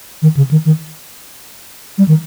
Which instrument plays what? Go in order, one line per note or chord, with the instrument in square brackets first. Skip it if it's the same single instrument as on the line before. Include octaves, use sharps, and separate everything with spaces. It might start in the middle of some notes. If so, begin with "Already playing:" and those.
[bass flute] D#3
C#3
D#3
D#3
G3
D#3